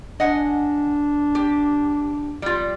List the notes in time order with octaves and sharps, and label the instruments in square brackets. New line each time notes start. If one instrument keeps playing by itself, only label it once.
[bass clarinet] D4 [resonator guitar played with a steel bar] D#5 F#5 G#5
[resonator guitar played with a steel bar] G4
G3 F4